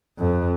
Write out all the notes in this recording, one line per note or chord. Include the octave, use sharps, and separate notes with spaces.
F2